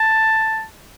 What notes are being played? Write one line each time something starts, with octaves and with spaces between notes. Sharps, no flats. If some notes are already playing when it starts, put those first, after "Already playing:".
Already playing: A5